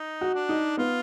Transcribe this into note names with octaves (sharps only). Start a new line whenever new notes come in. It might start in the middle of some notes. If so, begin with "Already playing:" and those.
Already playing: D#4
F#4
D4
D#4
B3 F4